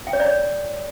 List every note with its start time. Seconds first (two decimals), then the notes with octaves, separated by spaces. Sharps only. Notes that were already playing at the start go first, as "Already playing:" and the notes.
0.07 G5
0.13 C#5
0.20 D5
0.26 C#5